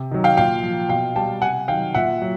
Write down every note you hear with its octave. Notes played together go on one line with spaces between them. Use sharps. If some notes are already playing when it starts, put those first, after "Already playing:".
Already playing: C3
D#3 F#3
F5 G5
A#2 F5 G5
F3
B2 F5 G5
G3 G5 A5
C3 F#5 G#5
D#3 F#3 F5 G5
A#2 E5 F#5
F#3